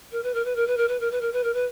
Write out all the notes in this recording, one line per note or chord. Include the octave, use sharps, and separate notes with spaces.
A#4
B4
A#4
B4
A#4
B4
A#4
B4
A#4
B4
A#4
B4
A#4
B4